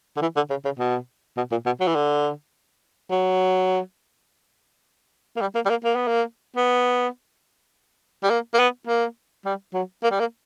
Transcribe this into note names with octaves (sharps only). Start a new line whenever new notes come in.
D3
E3
D3
C#3
C#3
B2
B2
A#2
B2
F#3
E3
D3
F#3
A#3
G3
A#3
G3
A#3
A#3
B3
A#3
B3
G3
A#3
A#3
B3
A#3
G3
F#3
A#3
G3
A#3